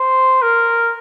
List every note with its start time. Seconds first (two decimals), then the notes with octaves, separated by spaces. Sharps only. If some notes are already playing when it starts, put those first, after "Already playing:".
Already playing: C5
0.42 A#4